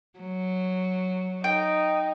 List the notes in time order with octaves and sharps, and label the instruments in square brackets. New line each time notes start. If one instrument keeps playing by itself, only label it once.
[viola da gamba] F#3
[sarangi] D#4 [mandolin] G5